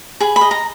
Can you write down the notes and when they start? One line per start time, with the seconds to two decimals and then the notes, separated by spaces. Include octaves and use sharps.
0.20 G#4 B5
0.36 B5
0.41 D#5
0.51 A#5